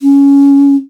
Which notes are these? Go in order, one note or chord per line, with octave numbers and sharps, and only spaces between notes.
C#4